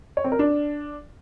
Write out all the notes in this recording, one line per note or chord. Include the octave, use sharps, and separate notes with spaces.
C#5
C4
A#4
D4